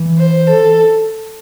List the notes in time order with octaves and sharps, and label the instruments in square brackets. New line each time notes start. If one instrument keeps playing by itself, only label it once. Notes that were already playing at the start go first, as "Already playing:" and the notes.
Already playing: [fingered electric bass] E3
[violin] C5
A4